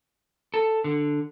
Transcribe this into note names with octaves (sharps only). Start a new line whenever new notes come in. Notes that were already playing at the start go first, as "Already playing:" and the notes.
A4
D3